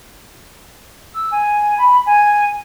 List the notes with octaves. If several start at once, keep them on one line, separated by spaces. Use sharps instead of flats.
E6
G#5
B5
G#5